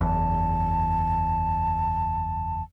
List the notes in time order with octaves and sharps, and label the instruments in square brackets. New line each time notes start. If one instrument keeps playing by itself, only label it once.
[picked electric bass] F#1 E2 [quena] A5